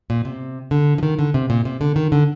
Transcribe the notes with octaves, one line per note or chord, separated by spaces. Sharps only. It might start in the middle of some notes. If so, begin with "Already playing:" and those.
A#2
C3
D3
F3
D#3
D3
C3
A#2
C3
D3
D#3
D3